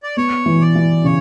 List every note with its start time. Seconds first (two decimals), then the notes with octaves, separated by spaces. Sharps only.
0.03 D5
0.17 B3 C#5
0.46 E3
0.61 D5
0.75 E3
1.04 C#3 C#5